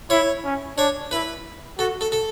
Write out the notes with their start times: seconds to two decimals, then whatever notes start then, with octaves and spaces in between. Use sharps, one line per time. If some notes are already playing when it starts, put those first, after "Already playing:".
0.10 E4 C#5
0.44 C#4
0.77 D4 C#5
1.11 E4 B4
1.78 F#4 A4
2.01 A4
2.12 A4